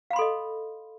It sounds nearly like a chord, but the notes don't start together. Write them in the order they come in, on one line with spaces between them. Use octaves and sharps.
F5 B5 C6 A4 D#5